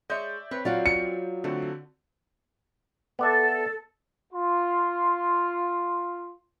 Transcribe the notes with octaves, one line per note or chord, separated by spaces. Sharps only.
G#3 C#5 D5 E5 G6
C4 B4 C#5
F#3 F4 D5 F5 F#5
C#7
D3 A3 C4 F#4
B3 A4 D5 E5
F4 C6